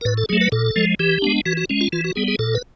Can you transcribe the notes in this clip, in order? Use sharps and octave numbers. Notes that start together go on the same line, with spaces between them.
A#4
A2 B4
A4
F#3 A3 G#4
B4
A#2 A4
F3 G#3
E3 G4
G#3 B3 D4
E3 F#4
F#4
G#3 C#4
F4
E3 F4
F#4
G3 B3 G#4
G#4
A#2 A4
B4